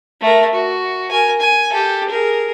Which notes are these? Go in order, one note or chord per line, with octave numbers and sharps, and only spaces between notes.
A3 A#4
F#4
A#4 G#5
G#5
G4 A4
G#4 A#4